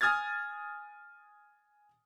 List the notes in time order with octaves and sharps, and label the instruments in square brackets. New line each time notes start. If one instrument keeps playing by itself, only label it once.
[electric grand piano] G#5 D#6 F6 G#6 A6